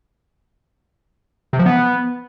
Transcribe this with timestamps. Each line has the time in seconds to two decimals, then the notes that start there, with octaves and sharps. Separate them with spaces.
1.53 C3
1.59 F3
1.66 B3